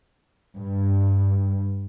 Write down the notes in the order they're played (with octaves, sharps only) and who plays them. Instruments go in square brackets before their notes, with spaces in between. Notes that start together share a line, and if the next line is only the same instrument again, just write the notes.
[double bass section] G2